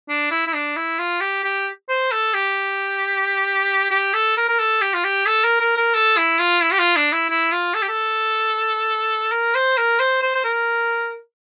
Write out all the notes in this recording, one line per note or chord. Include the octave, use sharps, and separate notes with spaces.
D4
E4
E4
D4
E4
F4
G4
G4
C5
A4
G4
G4
A4
A#4
A#4
A4
G4
F4
G4
A4
A#4
A#4
A#4
A4
E4
F4
E4
G4
F4
D4
E4
E4
F4
A4
G4
A4
A#4
C5
A#4
C5
C5
C5
A#4